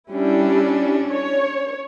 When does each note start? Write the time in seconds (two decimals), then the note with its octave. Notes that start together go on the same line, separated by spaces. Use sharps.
0.11 G3 C#4 D4 E4
1.12 C#5